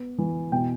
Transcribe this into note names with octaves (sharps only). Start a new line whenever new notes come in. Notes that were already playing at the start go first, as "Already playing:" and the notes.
Already playing: B3
E3
B2 G5